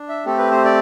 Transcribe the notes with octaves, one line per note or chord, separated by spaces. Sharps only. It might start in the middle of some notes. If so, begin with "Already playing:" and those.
Already playing: D4
E5
A3 C4 G4 A4
B4
C5
D5